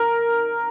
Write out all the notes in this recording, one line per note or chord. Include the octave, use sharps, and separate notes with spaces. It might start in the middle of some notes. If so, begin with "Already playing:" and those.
Already playing: A#4